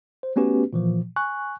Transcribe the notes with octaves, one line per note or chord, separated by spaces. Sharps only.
C5
A3 B3 C#4 F#4 G4 B4
A#2 E3 F3
G#5 C#6 F#6